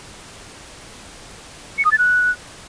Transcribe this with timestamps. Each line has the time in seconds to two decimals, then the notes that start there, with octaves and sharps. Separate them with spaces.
1.78 C#7
1.85 D#6
1.92 A6
1.98 F#6